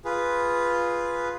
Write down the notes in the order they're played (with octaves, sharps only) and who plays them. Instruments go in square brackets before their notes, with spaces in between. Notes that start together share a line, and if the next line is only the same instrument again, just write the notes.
[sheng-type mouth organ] F4 G#4 B4